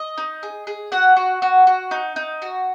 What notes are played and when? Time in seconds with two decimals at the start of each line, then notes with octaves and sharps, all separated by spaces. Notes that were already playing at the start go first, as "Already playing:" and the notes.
Already playing: D#5
0.18 D#4
0.43 G#4
0.67 G#4
0.92 F#4 F#5
1.17 F#4
1.42 F#4
1.67 F#4
1.91 D#4
2.16 D#4
2.42 F#4